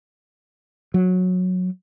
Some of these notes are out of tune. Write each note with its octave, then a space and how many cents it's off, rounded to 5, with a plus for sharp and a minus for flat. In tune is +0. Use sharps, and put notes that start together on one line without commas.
F#3 -15